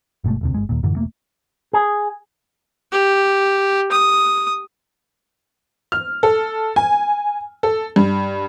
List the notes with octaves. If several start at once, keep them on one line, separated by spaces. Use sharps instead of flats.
G1 B2 G#3 A3
E1 D2 C3
G1 G#3
D#2 A#2
F#2 A2 D3 E3
E1 A3 A#3
G#4
G4
D#6
F6
A4
G#5
A4
G2